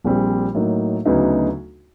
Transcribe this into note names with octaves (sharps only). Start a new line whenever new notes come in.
A#1 A#2 G3 C4
A2 F#3 A#3 D#4
D2 C#3 F#3 B3 D#4